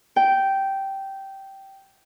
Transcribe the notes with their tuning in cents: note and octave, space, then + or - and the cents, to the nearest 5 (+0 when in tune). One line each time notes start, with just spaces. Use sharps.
G5 -10